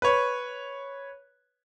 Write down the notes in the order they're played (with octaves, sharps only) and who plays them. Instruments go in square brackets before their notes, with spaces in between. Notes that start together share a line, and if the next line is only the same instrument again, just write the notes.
[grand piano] B4 C#5